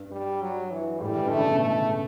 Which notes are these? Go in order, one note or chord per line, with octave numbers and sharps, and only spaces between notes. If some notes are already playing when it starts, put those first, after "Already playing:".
Already playing: G2
G3
F#3
E3
A2 G3
E3
D3 A3
C#3
B2
A2 A3
C#3